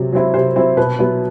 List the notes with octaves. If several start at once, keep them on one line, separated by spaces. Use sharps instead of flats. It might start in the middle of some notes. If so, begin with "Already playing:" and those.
Already playing: C3 F#3 C4
F#3 C4 E4
C3 C5
F#3 C4 E4
B2 B4
F#3 B3 E4